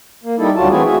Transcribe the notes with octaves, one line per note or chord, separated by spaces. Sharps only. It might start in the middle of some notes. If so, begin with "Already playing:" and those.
A#3
G3 D#4 E4 A4
D2 F#3 G3 F4 F#4 A5
E3 A3 C4 E4 F#4 G#4
F#4 G#4 E5